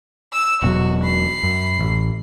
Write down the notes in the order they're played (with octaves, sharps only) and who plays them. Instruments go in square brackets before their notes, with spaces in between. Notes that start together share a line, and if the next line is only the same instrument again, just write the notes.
[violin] E6 E7
[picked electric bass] E1 B2 F#3 [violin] F#4
[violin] B5 C7
[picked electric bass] F#2
A1